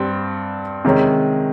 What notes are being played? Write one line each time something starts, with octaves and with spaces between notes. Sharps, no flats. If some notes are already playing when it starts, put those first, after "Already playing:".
Already playing: G2 G3 C4
C3 D#3 G#3 C#4